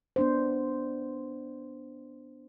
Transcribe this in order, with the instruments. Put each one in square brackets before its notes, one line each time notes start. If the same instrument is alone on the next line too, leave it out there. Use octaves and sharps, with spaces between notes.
[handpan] B3 D4 C5